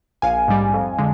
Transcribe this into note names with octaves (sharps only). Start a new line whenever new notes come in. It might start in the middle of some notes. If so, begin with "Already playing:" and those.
A#1 F5 G#5
G#2 G3
F2
D3 G#3